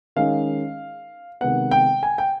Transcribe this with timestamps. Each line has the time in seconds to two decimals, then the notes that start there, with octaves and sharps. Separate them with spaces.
0.16 D#3 G#3 C#4 F5
1.41 C3 D#3 G#3 B3 F#5
1.71 G5
2.03 G#5
2.18 G5